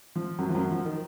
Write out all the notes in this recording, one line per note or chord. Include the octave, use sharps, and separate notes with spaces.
F3
F#2 F#3
F3
F#2 F#3
F3
D#3